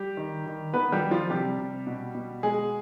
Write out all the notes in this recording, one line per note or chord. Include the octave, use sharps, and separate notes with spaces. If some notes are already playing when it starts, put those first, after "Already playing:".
Already playing: G3 G4
D#3
D#3
D#3 B3 B4
G3 G4
D#3
F3 F4
C3 G3 G4
C3
B2
B2
B2 G#3 G#4